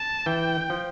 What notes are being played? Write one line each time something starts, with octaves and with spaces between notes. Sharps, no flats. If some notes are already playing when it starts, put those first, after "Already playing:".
Already playing: A5
E3 G5
F3